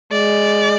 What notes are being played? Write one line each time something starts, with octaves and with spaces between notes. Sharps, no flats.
G#3 D5